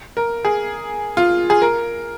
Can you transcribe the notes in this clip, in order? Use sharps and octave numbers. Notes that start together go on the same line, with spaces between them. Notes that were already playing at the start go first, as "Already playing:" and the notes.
A#4
G#4
F4
G#4
A#4